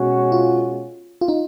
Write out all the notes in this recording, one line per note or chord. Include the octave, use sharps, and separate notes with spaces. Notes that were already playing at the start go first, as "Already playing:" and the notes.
Already playing: B2 G#3 C#4 F#4
F4
F4
D#4